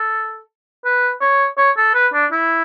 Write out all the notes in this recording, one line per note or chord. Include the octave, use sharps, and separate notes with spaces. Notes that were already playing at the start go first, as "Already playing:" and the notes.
Already playing: A4
B4
C#5
C#5
A4
B4
D4
E4